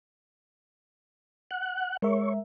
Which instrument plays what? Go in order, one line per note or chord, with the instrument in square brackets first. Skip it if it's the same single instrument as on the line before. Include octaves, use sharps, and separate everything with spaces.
[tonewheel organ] F#5
[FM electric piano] G#3 A#4 E5 [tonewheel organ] C#5